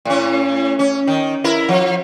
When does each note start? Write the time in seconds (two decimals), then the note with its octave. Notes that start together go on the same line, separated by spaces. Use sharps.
0.05 A2 C#4
0.79 C#4
1.07 D#3
1.44 E4 A#4
1.69 F3